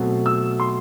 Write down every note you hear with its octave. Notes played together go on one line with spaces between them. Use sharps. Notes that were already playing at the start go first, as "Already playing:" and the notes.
Already playing: B2 F#3 A3 C4
E6
C6